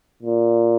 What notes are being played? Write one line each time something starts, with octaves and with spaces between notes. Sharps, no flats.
A#2